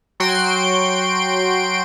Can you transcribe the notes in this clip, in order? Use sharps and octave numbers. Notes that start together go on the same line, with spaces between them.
F#3 F#4 G5 C6 D7